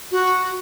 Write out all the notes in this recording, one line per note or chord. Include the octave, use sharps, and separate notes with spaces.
F#4